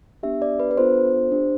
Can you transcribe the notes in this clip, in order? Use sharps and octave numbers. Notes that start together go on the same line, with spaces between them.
B3 D4 G4 E5
D5
B4
B4
B3 D4 F4 A4 C5
D4 G4